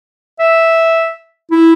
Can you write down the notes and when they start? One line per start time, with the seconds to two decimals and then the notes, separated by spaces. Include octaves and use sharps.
0.39 E5
1.51 E4